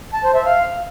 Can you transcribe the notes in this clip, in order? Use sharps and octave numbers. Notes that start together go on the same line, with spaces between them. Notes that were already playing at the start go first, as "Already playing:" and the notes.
A5
C5
E5
F5